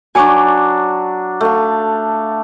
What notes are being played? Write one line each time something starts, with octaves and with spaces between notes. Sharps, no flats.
F#3 D4 G#5 C#6 D6
A3 F5